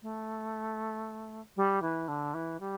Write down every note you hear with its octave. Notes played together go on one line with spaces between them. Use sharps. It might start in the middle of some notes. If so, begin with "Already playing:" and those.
A3
G3
E3
D3
E3
G3